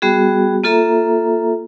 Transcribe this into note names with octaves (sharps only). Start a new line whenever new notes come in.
G3 B3 F#4 G#4
A#3 F4 A4 E5 A#5